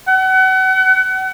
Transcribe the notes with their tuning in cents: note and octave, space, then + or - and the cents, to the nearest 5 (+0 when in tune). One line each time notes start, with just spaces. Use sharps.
F#5 +35